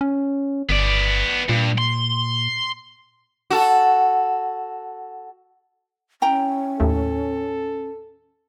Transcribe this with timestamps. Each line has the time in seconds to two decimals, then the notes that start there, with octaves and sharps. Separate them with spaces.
0.01 C#4
0.69 G1 B3 D5
1.49 G2 A#2
1.78 C6
3.50 F#4 A4
6.22 C#4 E4 G5 A#5
6.80 D#2 A2 A4